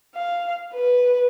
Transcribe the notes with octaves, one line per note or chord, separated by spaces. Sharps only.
F5
B4